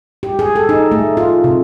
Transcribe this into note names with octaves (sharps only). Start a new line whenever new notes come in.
G4
G#4
A4
D#4
A3
F4
C3